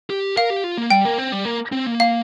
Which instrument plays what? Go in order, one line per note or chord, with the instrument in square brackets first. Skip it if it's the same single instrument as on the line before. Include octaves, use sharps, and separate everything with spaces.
[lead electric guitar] G4
[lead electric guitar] A#4 [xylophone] F5
[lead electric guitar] G4
F4
A#3
[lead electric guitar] G3 [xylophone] G5
[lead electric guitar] A#3
C4
G3
A#3
C4
A#3
[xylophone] F5